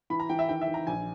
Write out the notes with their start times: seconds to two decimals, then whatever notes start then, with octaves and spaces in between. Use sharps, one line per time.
0.10 E3 B5
0.20 A#5
0.29 E3 G5
0.39 E5
0.49 D#3 G5
0.61 E5
0.68 D#3
0.74 A#5
0.87 A#1 G#5